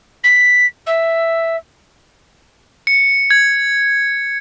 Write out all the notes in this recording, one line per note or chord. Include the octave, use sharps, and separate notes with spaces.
B6
E5
C#7
G#6